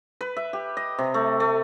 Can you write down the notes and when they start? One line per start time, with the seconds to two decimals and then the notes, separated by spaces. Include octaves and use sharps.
0.21 B4
0.37 E5
0.53 G4
0.77 D#5
0.99 C3
1.14 A3
1.40 A3